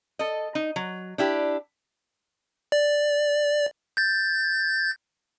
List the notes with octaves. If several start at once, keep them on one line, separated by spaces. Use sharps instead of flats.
A4 D#5
D#4
F#3
D4 E4 G4
D5
G6 A6